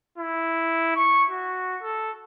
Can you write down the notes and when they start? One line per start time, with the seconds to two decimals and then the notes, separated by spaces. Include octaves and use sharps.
0.18 E4
0.96 C#6
1.30 F#4
1.82 A4